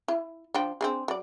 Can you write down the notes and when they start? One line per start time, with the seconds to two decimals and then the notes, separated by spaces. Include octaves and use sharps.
0.08 E4
0.54 F3 D4 G5
0.81 C4 D4 G#4
1.08 F#3 D5